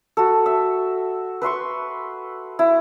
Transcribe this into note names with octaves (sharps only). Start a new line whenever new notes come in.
F#4 A4
E5
B4 E5 C6 C#6
E4